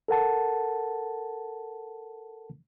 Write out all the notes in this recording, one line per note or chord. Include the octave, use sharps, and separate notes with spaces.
A4 A#4 F#5 A5